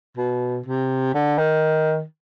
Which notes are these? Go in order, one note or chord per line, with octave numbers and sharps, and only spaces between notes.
B2
C3
D3
D#3